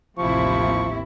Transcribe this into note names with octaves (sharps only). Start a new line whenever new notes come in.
A1 D#2 C3 F3 E4 C#6